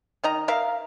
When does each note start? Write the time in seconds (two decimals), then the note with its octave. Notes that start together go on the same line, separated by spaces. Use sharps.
0.24 D#3 D#5 A#5
0.48 A#4 E5 F5